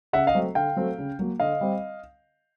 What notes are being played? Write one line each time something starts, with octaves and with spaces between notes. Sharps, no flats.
C#3 E5 F#5
D#5 F5
F#3 A3 C4
D3 F5 G5
F#3 A3 C4
C#3
F#3 A#3
D3 D#5 F5
G3 C4